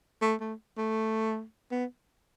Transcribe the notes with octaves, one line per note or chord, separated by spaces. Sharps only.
A3
A3
A3
B3